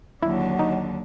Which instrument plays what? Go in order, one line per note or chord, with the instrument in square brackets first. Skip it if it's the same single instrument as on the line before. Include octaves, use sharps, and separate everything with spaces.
[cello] D#2 D3 [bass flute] F#3 [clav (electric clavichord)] E4
[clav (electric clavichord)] D#4